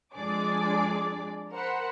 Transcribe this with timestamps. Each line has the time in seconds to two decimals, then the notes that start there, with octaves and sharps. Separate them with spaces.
0.14 F2 G#3 D4 G#4 D5 D6
1.52 A#4 C5 F#5 B5